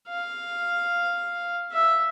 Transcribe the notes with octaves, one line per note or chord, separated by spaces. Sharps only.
F5
E5